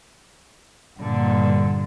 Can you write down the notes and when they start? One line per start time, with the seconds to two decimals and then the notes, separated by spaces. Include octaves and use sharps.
1.00 G2 A#2 D3